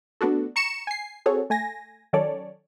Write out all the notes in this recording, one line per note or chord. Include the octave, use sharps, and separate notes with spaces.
A3 B3 D4 F#4 A4
A#5 C#6 C#7 E7
G#5 C7
C4 F#4 G#4 A4 C#5
A3 G#5 A#6
D#3 F#3 C#4 A4 C#5 D5